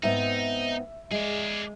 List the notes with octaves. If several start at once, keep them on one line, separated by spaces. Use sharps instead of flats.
G#2 B3 C4 D#4 E5
G#3 G#4 D5